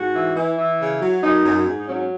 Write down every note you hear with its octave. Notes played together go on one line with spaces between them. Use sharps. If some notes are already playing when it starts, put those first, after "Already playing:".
Already playing: G#2 F#4
E3
E3 E4
E3
C#3
F#3
F#2 D#4
F#2
G#2
D#4
F#3 C#4
C#4